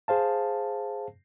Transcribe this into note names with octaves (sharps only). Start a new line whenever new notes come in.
G#4 C5 F5 A5